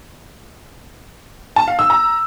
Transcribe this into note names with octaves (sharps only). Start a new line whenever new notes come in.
A5
F5
E6
A#5